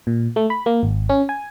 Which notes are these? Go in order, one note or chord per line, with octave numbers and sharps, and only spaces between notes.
A#2
A3
B5
A#3
G#1
C#4
G#5